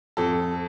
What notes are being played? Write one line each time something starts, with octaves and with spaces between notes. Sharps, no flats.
F2 A4